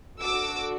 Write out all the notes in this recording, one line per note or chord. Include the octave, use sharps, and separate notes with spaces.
D4 F#4 A4 D6 E6